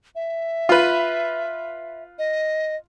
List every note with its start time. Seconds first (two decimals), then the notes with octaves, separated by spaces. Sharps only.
0.15 E5
0.69 F4 B4
2.19 D#5